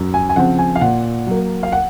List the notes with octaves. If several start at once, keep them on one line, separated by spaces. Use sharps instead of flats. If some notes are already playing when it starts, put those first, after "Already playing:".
Already playing: F#2
G#5
G#5
C#3 F3 C4 F#5
G#5
F5
A#2 F#5
F#3 A#3
F5
F#5